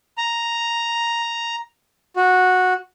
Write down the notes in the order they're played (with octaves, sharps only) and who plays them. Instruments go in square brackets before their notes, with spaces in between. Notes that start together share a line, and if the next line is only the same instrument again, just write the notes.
[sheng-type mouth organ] A#5
F#4